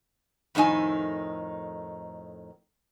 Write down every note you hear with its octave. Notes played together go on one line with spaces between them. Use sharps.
F2 A2 D#3 D#4 G#5